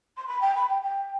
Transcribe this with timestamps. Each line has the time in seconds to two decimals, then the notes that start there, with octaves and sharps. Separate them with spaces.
0.17 C6
0.27 B5
0.41 G5
0.55 B5
0.69 G5
0.83 G5